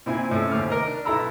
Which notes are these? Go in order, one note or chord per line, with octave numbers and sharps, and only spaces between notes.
A#2 C4 E4 G#5
A2 C#4 A4
D#2 A3 C5 D6 F6
A#4 D#5
D4
B1 E4 A4 A#5 B5 E6